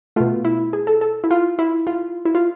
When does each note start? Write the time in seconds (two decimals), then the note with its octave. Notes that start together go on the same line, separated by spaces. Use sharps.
0.16 B2 A3 F4
0.45 E4
0.73 G#4
0.87 A4
1.01 A4
1.24 E4
1.31 F4
1.59 E4
1.87 F4
2.25 E4
2.35 F4